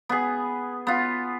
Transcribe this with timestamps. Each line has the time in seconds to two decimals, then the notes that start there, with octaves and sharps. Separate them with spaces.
0.09 B3 G#4
0.87 B3 F4